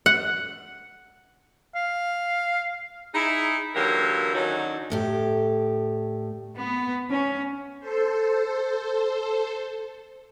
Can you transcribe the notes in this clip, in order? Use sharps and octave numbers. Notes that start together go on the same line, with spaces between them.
F#5
F5
D#4 E4 G#4
D3 E3 F#3 A#3 G4 A#4
D3 D#3 F#3 C#4 D#4 F#4
D2 A2 G4
B3
C#4
A4 C5